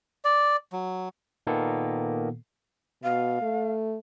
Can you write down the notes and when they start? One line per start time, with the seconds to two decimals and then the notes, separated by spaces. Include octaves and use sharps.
0.25 D5
0.73 F#3
1.47 A#2 D#3 A#3 B3 A4
3.04 B2 F5
3.42 A3